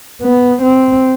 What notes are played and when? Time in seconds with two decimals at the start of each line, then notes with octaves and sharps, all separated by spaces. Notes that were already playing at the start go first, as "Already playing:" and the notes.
0.22 B3
0.62 C4